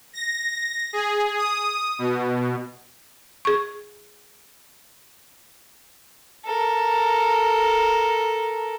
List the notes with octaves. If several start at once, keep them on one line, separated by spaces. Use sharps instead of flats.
A#6
G#4
D#6
B2
G#4 C#6
A4 A#4